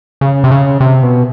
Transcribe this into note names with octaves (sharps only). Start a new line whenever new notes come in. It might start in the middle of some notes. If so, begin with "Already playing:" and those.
C#3
C3
C#3
C3
B2